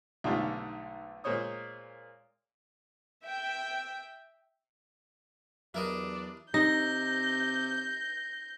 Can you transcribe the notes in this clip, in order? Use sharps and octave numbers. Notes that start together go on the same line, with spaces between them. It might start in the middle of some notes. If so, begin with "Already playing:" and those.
B1 G#2 D3 G3 A3 F4
A#2 G#3 C5 C#5 D#6
E5 G5
E2 F#3 D4 E4 G4 A#4 D#5
C3 D#4 G6 A#6